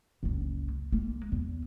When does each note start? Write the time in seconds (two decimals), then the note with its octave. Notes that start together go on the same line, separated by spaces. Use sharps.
0.23 F#1 C#2
0.93 G#3 A#3
1.32 E2